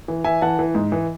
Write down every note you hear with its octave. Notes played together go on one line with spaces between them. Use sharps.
E3
E3 E5 G#5
E3 F#5 A5
E3
G#2
E3